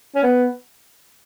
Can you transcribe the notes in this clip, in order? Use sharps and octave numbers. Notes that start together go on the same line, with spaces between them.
C#4
B3